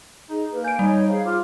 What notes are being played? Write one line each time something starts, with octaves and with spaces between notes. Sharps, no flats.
D#4 G#4
A#3 B4
D5 F5 G#5 G6 D7
G3 D#4 C#5
G#4 C5 F5
F4 D6 F6